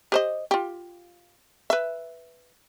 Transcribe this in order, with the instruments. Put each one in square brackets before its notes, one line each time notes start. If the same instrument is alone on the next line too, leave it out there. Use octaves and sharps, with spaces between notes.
[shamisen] G4 C5 D#5
F4 G4
B4 E5